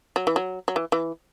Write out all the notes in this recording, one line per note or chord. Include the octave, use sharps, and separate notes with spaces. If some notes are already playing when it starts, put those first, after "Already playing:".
F#3
E3
F#3
F#3
E3
E3